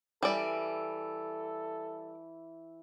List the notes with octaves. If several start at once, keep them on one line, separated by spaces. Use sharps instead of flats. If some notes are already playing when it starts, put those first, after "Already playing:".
E3 G3 A4 D5